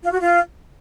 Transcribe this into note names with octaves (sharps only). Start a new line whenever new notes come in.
F4
F#4
F4